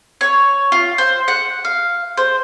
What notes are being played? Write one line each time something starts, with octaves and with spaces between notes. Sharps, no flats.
C#5
F4
C5
F#5
F5
C5